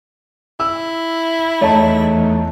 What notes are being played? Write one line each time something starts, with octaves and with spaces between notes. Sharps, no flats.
E4 E6
E2 A3 D#4 C#5 A5